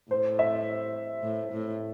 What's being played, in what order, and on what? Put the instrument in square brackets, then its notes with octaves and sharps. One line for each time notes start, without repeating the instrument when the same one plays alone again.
[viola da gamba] A2 [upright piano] C5
[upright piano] E5
[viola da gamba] A2
A2